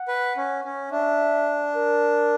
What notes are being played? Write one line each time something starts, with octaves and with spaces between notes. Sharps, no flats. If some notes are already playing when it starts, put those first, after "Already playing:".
Already playing: F#5
B4
C#4
C#4
D4 E5
A#4